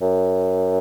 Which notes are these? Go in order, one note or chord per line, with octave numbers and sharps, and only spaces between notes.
F#2